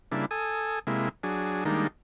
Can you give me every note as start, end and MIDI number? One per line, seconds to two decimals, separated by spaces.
0.12 0.26 49
0.12 0.26 55
0.12 0.26 58
0.12 0.26 62
0.12 0.26 64
0.31 0.79 69
0.31 0.79 80
0.31 0.79 87
0.87 1.09 48
0.87 1.09 56
0.87 1.09 58
0.87 1.09 64
1.23 1.64 54
1.23 1.64 62
1.23 1.64 68
1.65 1.87 51
1.65 1.87 55
1.65 1.87 56
1.65 1.87 58
1.65 1.87 62
1.65 1.87 63